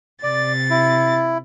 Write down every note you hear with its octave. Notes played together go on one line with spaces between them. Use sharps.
C3 D5 A6
E4